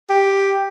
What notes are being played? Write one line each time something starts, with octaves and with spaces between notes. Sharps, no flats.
G4